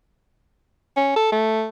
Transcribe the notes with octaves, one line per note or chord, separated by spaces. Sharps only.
C#4
A4
A3